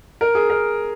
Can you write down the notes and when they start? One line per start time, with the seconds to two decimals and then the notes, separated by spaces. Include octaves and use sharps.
0.21 A#4
0.35 G#4
0.50 A#4